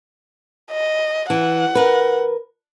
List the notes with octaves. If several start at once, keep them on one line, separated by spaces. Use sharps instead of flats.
D#5
E3 F#5
A#4 B4